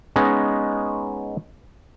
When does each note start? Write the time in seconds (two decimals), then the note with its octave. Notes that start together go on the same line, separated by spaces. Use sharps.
0.16 G#3 B3 C#4 D#4